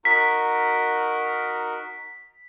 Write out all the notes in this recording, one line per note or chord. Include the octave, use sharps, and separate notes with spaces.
D#4 F#4 A#4 B6